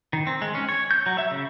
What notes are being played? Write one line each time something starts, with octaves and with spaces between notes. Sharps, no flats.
D#3
C4
G#3
C#4
C#5
G6
F#3
E5
C#3